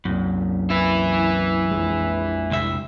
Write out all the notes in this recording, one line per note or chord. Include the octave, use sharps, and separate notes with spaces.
C2 F#2 A#2
E4 B4
A#1 F2 G#3
C2 E5